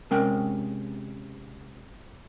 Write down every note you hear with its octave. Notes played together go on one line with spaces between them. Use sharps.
C3 G#3 C#4 A#4 G5